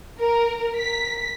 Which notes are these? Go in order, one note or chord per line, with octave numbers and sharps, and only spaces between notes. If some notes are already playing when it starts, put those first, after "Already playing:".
A#4
B6